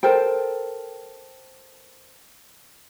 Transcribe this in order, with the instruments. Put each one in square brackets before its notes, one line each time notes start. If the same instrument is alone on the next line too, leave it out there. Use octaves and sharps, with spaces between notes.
[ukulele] A4 A#4 C5 G5